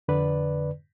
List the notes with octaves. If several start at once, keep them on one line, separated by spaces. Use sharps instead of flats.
F2 D3 B4 D5